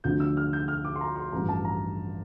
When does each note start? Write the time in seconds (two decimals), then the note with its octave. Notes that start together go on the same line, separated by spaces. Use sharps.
0.04 D2 D3 F3 G6
0.20 E6
0.37 F6
0.53 G6
0.68 F6
0.85 D6
0.96 C6
1.01 A#5
1.16 C6
1.33 A1 G2 F3 A#5
1.49 A5
1.65 A#5